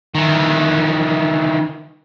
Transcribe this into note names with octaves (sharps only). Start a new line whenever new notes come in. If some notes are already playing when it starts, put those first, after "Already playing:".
D#3 E3